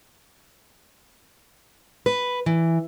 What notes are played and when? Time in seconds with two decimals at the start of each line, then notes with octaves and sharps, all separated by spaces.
2.06 B4
2.46 E3